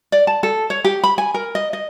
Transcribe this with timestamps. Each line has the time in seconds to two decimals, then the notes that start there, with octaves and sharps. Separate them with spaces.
0.12 D5
0.27 A5
0.43 A4
0.70 C#5
0.84 G4
1.04 B5
1.18 G#5
1.34 A#4
1.55 D#5
1.73 D#5